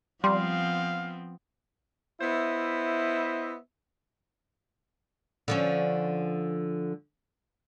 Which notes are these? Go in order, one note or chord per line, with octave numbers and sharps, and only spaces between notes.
F3 G3 B3 C4 F5 C6
B3 E4 C5 D#5 E5
D3 F3 C#4